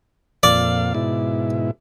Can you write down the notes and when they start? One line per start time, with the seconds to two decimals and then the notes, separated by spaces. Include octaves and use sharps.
0.43 F2 A#2 D5 F5
0.94 G#2 B2 E4